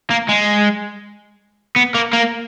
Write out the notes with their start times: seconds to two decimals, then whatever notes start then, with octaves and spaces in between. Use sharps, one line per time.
0.10 A#3
0.28 G#3
1.76 B3
1.95 A#3
2.13 A#3